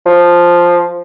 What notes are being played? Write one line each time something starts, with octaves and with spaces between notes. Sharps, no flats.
F3